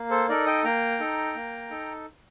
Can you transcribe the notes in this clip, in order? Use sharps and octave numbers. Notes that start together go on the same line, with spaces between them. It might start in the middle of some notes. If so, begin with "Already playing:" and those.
Already playing: A#3
A4 C5
D#4 A4 A#4 D5
D#5 G5
A#3 G5 A#5
D#4 A4
A#3
D#4 A4